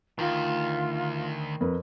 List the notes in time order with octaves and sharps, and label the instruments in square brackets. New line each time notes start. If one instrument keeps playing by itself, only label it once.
[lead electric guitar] D2 [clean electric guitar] D#3 [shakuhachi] F4
[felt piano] F2 A#4 B4